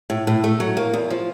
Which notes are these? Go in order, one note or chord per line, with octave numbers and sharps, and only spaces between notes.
A2
A2
A3
F#3
A#3
E2
F3